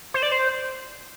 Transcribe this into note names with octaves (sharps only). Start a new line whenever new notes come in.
C5
D5
C5